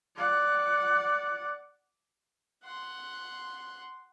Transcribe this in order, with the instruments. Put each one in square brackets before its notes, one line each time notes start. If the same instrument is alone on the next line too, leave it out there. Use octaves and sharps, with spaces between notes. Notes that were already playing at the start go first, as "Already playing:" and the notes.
[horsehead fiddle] D5 F#5
[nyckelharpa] F#5 C6